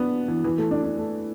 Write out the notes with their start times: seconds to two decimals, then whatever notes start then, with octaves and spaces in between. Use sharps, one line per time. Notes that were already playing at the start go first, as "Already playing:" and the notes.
Already playing: B3 D4
0.28 E3
0.44 E3
0.58 A3
0.71 D4
0.84 D4
0.97 A3